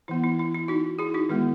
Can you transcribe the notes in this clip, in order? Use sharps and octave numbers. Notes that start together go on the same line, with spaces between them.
E3 B3 E4
E4
E4
E4
D#4 F#4
E4 G#4
D#4 F#4
D#3 G#3 B3 E4